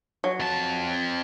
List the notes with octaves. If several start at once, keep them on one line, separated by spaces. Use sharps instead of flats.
F#3
F2 A5